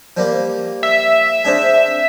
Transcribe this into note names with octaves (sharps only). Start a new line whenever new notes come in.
F3 G3 A#3
E5
C4 D4 G#4